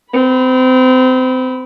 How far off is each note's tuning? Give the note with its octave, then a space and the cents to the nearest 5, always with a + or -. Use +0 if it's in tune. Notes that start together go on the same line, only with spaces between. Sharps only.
C4 -30 B5 +0